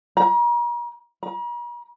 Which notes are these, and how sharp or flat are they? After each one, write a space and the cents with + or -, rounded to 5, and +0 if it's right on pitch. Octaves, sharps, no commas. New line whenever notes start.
A#5 +40
A#5 +45